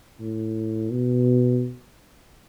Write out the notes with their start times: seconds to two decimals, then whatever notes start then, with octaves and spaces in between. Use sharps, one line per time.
0.21 A2
0.91 B2